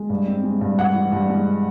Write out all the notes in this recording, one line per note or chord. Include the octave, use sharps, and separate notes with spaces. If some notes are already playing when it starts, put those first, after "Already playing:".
Already playing: G#3
G2
C4
G#3
G2
G2 F#5
E3
G2
G#3